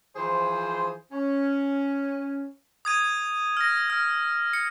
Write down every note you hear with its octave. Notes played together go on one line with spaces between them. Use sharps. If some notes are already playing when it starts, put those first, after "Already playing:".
E3 F3 G#4 C5
C#4
D#6 G#6 D#7
F6 A#6
F6
C#7